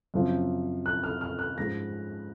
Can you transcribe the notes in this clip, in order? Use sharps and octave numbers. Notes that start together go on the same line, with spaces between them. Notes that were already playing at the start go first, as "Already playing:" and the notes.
F#2 C#3 F3 C4
F#6
F6
F6
F#6
G#2 F3 G#3 C#4 A#6